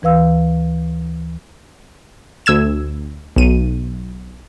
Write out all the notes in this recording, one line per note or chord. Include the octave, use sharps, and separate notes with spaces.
D2 E3 B4 F5 E6
D2 E6 G#6 E7
B1 D#7